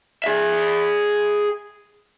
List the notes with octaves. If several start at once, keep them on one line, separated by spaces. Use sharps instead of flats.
G#4 E5